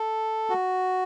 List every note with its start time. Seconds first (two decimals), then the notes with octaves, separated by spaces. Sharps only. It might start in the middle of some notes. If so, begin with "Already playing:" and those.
Already playing: A4
0.50 F#4